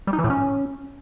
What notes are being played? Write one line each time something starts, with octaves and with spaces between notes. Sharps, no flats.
G3
D#4
E3
A2
C#4